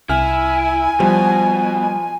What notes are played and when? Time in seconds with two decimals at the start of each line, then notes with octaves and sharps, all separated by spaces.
0.09 C2 E4 G#5 F6
1.00 B2 F3 G3